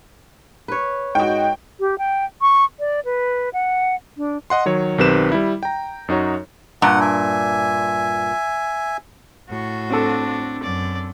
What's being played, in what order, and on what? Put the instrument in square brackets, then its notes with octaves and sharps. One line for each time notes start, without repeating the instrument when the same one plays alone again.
[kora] B4 C#5
[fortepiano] G#2 F#4 [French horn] D#5 [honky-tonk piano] G5
[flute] G4
G5
C#6
D5
B4
F#5
D4
[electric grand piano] D#5 F#5 C6
D#3 F#3 C#5
B1 D#3 C4 G4 B4 E7
G3 E4
G5 A#5
F#2 D#4 F#4 C#5
[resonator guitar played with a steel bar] G2 A#2 [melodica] F#5
[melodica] E5 G#5
[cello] A2 F#4
[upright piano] C4 A4 [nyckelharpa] D4
[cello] F#2 [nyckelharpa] D5